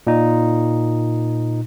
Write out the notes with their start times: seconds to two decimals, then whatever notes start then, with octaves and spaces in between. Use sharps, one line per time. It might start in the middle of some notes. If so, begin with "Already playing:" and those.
0.07 A#2 D#4